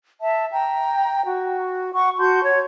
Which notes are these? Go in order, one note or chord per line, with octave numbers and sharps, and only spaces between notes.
E5 A5
G5 A#5
F#4
F#5 C#6
F#4 A5 C6 G6
C#5 G#6